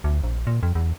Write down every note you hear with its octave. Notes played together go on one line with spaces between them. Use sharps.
D2
A#1
A#2
F2
E2